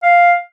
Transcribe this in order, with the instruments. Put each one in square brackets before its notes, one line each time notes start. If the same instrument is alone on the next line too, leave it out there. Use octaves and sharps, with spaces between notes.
[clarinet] F5